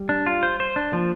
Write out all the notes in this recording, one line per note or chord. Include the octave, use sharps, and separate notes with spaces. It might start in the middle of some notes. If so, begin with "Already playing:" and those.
Already playing: G3
D4
F4
C5
C5
D4
F3 A#3